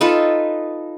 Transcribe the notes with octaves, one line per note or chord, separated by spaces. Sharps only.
D#4 F4 A4 B4